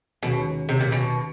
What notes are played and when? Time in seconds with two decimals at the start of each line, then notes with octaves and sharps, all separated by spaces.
0.23 D#2 B2 D#3 G#3 C#4 F#4
0.69 C3
0.80 A#2
0.92 B2